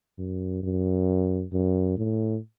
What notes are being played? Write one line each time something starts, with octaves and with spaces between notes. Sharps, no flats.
F#2
F#2
F#2
A2